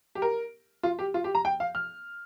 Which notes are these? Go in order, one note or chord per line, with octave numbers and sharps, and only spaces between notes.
G4
A#4
F4
G4
F4
G4
A#5
G5
F5
F6